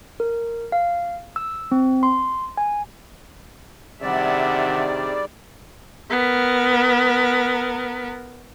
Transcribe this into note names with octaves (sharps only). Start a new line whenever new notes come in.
A#4
F5
E6
C4
C6
G#5
C3 D#3 G3 D4 G#4 D5 E5 F#5
B3 A#4